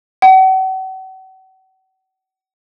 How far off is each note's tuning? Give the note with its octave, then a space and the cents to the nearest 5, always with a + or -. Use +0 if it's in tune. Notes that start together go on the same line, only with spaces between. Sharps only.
F#5 +40